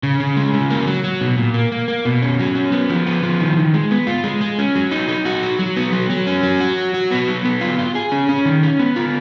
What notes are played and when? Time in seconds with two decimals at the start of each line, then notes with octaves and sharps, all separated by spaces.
0.03 C#3
0.20 C#3
0.37 G#3
0.54 C#3
0.70 A#3
0.87 F#3
1.04 F#3
1.21 B2
1.38 A#2
1.54 A#3
1.72 A#3
1.88 A#3
2.05 B2
2.22 C#4
2.39 F#3
2.55 C#4
2.72 B3
2.90 F3
3.07 B3
3.23 F3
3.40 D#3
3.57 D#3
3.74 G#3
3.91 B3
4.07 F4
4.24 G#3
4.41 G#3
4.59 C#4
4.75 F#3
4.91 D#4
5.09 D#4
5.25 F#4
5.43 F#3
5.59 F#3
5.76 B3
5.93 F#3
6.10 F#3
6.27 C#4
6.43 F#3
6.60 F#4
6.78 F#3
6.94 F#4
7.11 B3
7.28 F#3
7.45 B3
7.61 F4
7.78 F4
7.95 G#4
8.12 C#4
8.29 C#4
8.45 D#3
8.63 C#4
8.79 B3
8.96 F4